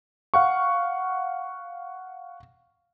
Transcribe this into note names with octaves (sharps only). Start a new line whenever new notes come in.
F5 F#5 C#6